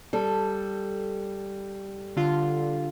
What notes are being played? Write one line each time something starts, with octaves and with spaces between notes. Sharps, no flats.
G3 A4
D3 F4